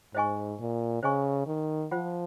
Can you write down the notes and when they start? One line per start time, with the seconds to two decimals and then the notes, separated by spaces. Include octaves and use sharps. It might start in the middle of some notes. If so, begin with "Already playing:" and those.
0.14 G#2 C5 D#5 G#5 C#6
0.60 A#2
1.03 C#3 C5 D#5 G#5 C#6
1.47 D#3
1.91 F3 F4 C5 F#5